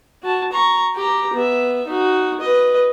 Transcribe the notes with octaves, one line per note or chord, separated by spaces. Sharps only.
F#4 A5
A#5 C#6
G4 A#5
B3 E5
D#4 F#4
B4 D#5